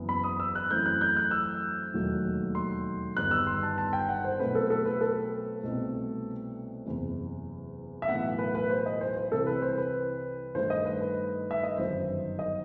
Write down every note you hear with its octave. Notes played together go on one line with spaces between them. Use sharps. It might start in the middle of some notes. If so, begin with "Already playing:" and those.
Already playing: F#1 F#2 E3 B3
B5
D#6
E6
F#6
F#2 E3 A3 C4 G6
F#6
G6
F#6
E6
E1 D#2 D#3 F#3 A3
C6
G1 G2 D#3 G3 B3 F#6
E6
C6
A5
A5
G5
F#5
C5
B1 B2 A3 C4 B4
A4
A4
B4
A4
C2 B2 A3 C4
F#1 E2 C3 E3
E5
B1 A2 E3 B3 F#5
B4
B4
C5
D#5
C5
C5
C2 C3 E3 G3 A4
B4
C5
B4
G2 D#3 A3 C5
D#5
B4
B4
E5
D#5
G1 F#2 D#3 C5
D#5